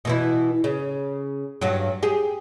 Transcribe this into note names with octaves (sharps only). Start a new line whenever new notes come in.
B2 E3 E4
C#3
G2 F#3
G4 G#4